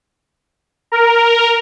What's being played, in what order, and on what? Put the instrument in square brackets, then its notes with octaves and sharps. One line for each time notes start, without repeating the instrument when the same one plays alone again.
[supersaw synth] A#4